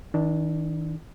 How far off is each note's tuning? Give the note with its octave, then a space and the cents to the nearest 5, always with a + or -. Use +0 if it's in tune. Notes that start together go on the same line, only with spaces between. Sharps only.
D#3 +40 D4 +0